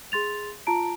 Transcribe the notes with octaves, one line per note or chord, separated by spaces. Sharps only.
G#4 C6 A6 F7
F4 A5 A#5 D7